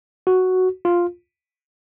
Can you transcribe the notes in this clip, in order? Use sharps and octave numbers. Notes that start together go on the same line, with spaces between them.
F#4
F4